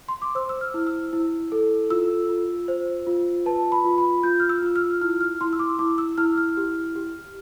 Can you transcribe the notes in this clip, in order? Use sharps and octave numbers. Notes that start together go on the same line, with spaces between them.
C6
D6
C5 E6
E6
F6
E4
E6
E4
A4
F4 E6
F4
C5
F4
B4 A5
B5
F4
B5
F4 G6
F6
E6
F4
F6
E4 F6
F6
E4 C6
E6
D6
E4 D6
E6
E4 F6
F6
G4
G4